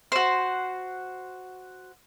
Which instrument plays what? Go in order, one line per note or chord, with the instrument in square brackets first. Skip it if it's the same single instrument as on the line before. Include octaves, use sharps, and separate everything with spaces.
[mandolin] F#4 C5